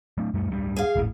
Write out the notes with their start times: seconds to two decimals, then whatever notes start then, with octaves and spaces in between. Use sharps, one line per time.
0.18 F#3 A3 D4
0.34 F#2 G3 A3
0.50 D1 G2 G3
0.77 G#4 F5
0.96 D#1 G#1 A2